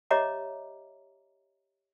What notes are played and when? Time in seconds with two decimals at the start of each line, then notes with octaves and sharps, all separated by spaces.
0.11 G4 C#5 D#5 E5 A#5 D6